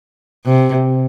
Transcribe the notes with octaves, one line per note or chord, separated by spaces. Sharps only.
C3